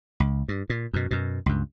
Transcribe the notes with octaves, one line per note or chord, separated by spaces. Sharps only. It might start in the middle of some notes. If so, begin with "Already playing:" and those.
C#2
G2
A#2
F#2 B2
F#2 B2
C#2 G2